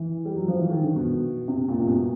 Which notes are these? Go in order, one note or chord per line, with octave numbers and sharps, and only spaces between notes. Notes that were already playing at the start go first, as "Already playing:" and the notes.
Already playing: E3
G3
F#3
F3
E3
D#3
D3
B2
C3
A#2
C3
B2